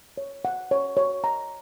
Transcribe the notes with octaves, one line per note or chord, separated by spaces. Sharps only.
C#5
F#5
C#5
C#5
A#5